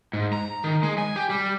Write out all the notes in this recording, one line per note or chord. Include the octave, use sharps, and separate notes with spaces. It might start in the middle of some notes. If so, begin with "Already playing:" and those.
G#2
A#5
D#3
G#3
G#5
G4
G3